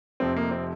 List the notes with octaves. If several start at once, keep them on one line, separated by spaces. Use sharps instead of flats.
F1 F2 C3 F3 C4
A#3
C4